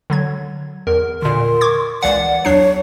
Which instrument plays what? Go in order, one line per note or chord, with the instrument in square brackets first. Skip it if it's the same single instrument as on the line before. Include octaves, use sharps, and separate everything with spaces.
[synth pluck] D3 F#3 G#6
[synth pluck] E2 [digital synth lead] A#4
[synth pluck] A#2 D3 [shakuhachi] C6
[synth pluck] C#6 D6 G#6
[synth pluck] C#2 E3 F5 [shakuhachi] D5 [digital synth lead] F#5
[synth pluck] E2 D4 C7 [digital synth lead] F#3 [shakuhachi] C#5